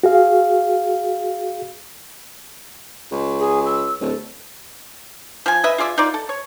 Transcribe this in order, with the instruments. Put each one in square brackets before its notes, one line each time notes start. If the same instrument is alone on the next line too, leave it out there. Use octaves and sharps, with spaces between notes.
[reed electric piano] F#4 G#4 F5
[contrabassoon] C#2
[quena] G#4
E6
[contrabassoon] D1 [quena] A4
[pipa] F3 G#5
B4 D#5 E5
F4 G#4 D5 E5
D#4 F4 D5
A4
C#5